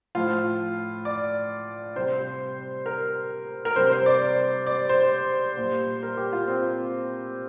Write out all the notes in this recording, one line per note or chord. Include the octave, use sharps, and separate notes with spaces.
A2 F3 F4
D5
C3 G3 C5
A#4
A#4
C3 G3 C5
C5
D5
D5
C5
A#2
G3
A#4
G4
F4
C4